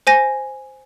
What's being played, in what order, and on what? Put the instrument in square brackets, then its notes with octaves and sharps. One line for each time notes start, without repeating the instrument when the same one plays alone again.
[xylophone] C5 G#5 A#6